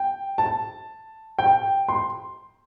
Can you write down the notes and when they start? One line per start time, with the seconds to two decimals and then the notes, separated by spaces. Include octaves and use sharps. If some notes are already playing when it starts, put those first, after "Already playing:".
Already playing: G5
0.38 A5
1.39 G5
1.89 C6